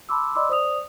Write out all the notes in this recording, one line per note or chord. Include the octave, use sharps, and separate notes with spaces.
A5 B5 C6 D6 E6
D5 D#5 B5 C6 D6 E6
C5 D5 D#6 F7